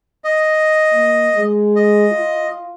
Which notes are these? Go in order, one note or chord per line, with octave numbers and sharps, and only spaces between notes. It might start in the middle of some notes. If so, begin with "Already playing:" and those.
D#5
A#3
G#3
D#5
F4